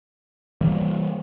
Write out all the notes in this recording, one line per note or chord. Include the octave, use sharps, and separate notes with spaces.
E3 G3 A#3